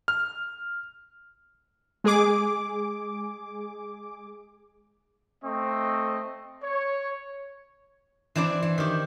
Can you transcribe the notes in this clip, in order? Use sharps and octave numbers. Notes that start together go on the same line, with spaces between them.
F6
G#3 G#4 D6
A3 C4 D#5 C#6
C#5
E3 C4 D4 E4 D5
E3
D#3 G4